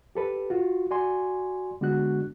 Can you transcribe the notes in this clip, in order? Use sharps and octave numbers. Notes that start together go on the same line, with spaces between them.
G4 A4 B4
F4 F#4
F#4 D5 G#5 C6
D3 G#3 B3 D4 F#4 F#6